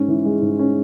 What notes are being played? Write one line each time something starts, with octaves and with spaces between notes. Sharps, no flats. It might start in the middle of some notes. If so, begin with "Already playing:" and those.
Already playing: G#2 C#4
E3
G#3
G#2
C#4